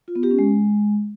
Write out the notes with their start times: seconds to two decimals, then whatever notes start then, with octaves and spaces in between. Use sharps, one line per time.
0.08 F4
0.15 B3
0.23 G4
0.31 C#4
0.39 G#3